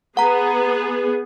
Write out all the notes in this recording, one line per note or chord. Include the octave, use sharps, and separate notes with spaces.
B3 G#4 F#5 A#5